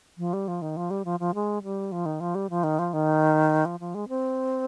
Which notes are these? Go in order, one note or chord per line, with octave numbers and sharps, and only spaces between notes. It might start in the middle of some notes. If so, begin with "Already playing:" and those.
F3
G3
F3
D#3
F3
G3
F3
F3
G#3
G3
F3
D#3
F3
G3
F3
D#3
F3
D#3
F3
F3
G#3
C4